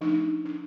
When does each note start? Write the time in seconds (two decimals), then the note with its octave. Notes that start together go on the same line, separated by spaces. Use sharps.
0.01 F3 A3 D4 D#4
0.45 D4